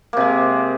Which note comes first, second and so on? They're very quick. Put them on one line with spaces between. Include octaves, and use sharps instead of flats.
A#3 C3 G#3